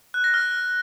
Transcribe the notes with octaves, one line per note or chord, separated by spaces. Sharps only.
F#6
A#6
F6